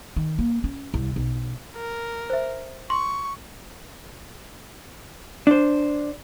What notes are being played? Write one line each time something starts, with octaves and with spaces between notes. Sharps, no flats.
D#3
A#3
C#4
C2
B1
A#4
C5 E5
C6 C#6
D4 C5